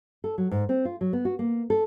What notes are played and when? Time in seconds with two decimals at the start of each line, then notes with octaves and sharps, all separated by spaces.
0.24 A4
0.38 F#3
0.51 G#2
0.69 C4
0.85 F4
1.01 F#3
1.13 B3
1.25 F#4
1.39 A#3
1.70 A4